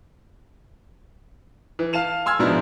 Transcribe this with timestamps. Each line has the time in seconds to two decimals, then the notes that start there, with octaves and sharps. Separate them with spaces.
1.79 E3
1.93 F5 A5 E7 F7
2.26 G#5 C6 E6 F6 G#6
2.39 G#2 B2 F3 D4 E4